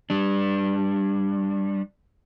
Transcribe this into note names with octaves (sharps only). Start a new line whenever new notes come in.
G3 D4